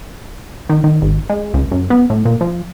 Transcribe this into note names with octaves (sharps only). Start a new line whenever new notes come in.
D#3
D#3
G#1
G#3
C#2
F#2
B3
A2
A#2
F3